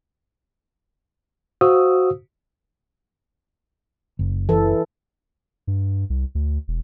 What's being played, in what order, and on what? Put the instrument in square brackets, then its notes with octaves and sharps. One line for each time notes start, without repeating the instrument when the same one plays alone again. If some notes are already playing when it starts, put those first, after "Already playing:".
[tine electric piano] F#4 C5 F5 D#6 E6
[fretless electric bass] F#1
[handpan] E3 A4
[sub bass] G2
C2
D2
E1